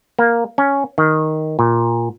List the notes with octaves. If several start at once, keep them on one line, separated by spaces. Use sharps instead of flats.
A#3
C#4
D#3
A#2